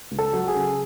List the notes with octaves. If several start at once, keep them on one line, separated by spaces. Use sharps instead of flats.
C#2
A4
F#3
G#4
C#3